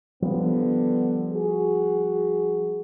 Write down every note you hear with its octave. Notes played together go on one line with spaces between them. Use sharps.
D3 F3 G3 B3
F#4 G#4